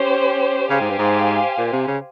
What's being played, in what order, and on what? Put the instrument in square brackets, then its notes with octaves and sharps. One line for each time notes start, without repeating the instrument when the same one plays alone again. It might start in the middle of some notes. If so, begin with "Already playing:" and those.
Already playing: [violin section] C#4 G4 C5
[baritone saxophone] C#3 [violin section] G4 C5 F5 G#5
[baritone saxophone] G#2
G2
G#2
A#2
C3
C#3